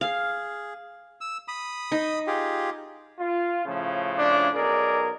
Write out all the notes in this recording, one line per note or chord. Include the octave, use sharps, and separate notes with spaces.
G#4 F5
E6
B5 D#6
D#4
F4 G4 G#4
F4
A2 C#3 F3
D4
B1 G#4 A#4 D5